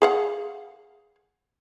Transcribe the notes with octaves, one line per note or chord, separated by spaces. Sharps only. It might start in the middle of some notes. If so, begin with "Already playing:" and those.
G#4 F5 F#5